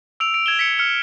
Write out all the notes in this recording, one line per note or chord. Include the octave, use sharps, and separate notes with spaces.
E6 D7 F7
D7
G#6 E7 G7
B6 C#7
F6 C#7 G7